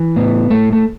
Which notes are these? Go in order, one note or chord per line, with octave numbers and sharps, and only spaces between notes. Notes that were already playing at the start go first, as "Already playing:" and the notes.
Already playing: E3
A2 B3
A2 A3
A3